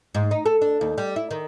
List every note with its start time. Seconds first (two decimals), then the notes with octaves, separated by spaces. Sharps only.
0.15 G#2
0.31 D#4
0.46 A4
0.61 D4
0.81 D#2
0.98 G3
1.16 E4
1.31 D#3